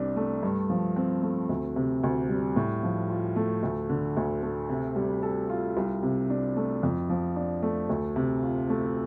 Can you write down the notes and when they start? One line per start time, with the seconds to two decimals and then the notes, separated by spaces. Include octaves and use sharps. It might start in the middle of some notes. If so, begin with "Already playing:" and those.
Already playing: C2 C3 D4
0.16 A3
0.43 G2
0.70 F3
0.96 C4
1.23 A3
1.49 D2
1.76 C3
2.04 D2
2.29 G3
2.56 A2
2.83 F3
3.10 F4
3.36 A3
3.63 D2
3.90 D3
4.17 D2
4.43 A3
4.69 C3
4.96 G3
5.23 A4
5.50 F4
5.77 C2
6.03 C3
6.30 D4
6.56 A3
6.83 F2
7.09 F3
7.36 D4
7.63 A3
7.90 D2
8.16 C3
8.43 F4
8.70 A3